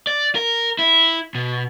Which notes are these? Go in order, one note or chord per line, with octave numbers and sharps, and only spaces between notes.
D5
A#4
E4
B2